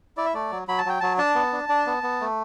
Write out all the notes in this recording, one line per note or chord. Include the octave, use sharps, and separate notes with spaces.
E4 D5
E5
A3 D5
F#3
F#3 B5
A5
F#3 G5
F#3 A5
D4 A5
B3
D4
D4
B3
B3
A3